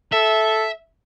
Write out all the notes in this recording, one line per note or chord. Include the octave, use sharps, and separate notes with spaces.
A4 E5